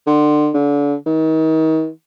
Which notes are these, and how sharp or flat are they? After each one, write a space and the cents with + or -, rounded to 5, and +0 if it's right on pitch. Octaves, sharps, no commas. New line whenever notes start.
D3 +30
D3 -35
D#3 +35